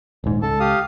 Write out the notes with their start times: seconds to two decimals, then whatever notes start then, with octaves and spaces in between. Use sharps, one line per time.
0.24 D#1 G#2
0.42 C#2 A4 A5
0.60 G4 F5 D#6